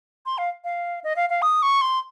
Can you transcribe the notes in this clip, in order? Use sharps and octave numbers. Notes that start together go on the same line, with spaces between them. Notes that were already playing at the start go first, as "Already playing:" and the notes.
C6
F5
F5
D#5
F5
F5
D#6
C#6
C6